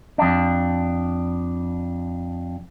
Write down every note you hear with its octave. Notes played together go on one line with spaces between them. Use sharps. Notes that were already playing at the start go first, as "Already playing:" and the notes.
F2 D4